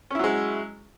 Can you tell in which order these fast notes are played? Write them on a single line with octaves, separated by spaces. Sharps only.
C#4 E4 F#3 G#3